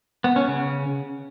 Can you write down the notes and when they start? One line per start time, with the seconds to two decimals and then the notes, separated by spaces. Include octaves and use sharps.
0.24 B3
0.36 C#4
0.48 C#3